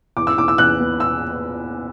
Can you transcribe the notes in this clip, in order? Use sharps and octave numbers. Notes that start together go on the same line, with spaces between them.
E2 D6
E6
E2 D6
E6
E2 F#6
B3
E6